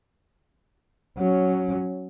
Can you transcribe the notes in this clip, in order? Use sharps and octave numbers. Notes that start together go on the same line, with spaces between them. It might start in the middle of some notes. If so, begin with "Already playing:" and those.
F#3 C#4